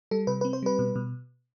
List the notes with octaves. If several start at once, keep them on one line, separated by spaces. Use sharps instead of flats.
G3 A4
C3 B4
B4
C4
C5
G3 B4
B2
B2